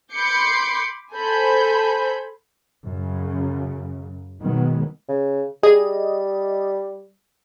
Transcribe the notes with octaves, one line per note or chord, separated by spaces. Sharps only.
B5 C6 D6 G6 C7 C#7
A4 C5 G#5 B5 G6
F#2 C#3
B2 D#3 F#3 G#3 B3
C#3
G3 G#4 D#5